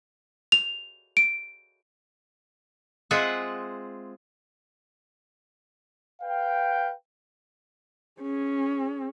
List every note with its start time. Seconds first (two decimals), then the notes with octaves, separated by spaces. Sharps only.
0.52 F7
1.17 D7
3.11 G#3 C4 F4 G#4 E5 F#5
6.22 B4 F5 G5
8.20 C#4 G#4